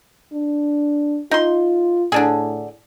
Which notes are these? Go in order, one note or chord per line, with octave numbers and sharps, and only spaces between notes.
D4
D#4 F4 C6
A2 D3 D4 G#4